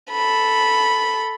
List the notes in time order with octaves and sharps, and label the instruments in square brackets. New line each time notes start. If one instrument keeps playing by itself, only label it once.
[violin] A4 B5